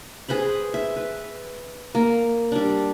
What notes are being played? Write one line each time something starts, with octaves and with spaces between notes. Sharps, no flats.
G#4 B4 C5 B5
E5
B4
A#3
G3 D4